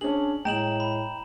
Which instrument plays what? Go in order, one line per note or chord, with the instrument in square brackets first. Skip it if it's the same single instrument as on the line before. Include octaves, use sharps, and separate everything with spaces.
[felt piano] C#4 G#4 [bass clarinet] D4 [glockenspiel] F#7
[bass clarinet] A2 [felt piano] G#3 [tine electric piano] G5 [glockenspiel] A#5 E7 F#7
[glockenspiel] B5